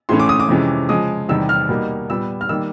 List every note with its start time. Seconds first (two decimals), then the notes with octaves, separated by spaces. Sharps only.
0.09 A2 E3 A3 C#4 C6
0.20 D6
0.29 D#6
0.40 D6
0.49 F2 C3 E3 G#3 C#4
0.89 C#3 F3 G#3 D#6
1.29 E2 C3 D#3 G3 E6
1.49 F6
1.69 B2 G3 A#3 D#4
2.09 A#2 G3 B3 E6
2.41 F6
2.49 D#3 G3 A#3 E6